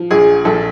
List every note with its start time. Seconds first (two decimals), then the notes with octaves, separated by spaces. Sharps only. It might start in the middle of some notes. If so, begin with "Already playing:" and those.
Already playing: F3
0.11 A#1 G#4
0.45 A#1 A4